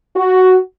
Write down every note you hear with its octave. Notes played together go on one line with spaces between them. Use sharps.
F#4